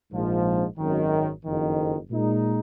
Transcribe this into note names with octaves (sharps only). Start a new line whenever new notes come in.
A#1 G#2 F3
G#1 F#2 D#3
F#1 F2 D#3
A#2 G#3 D#4